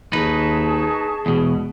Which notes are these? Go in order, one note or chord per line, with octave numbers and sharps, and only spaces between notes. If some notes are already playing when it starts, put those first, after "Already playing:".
D#2 D#4 G#4 B4 A5 C#6
E2 B2 G#3